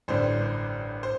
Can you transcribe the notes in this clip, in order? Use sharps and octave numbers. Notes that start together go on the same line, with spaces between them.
A1 G2 D3 C5
C5